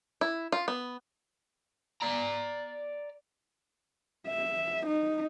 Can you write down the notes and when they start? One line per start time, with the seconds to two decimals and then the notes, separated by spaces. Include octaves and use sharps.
0.21 E4
0.52 F4
0.68 B3
2.02 D5 A#5
4.28 E5
4.87 D#4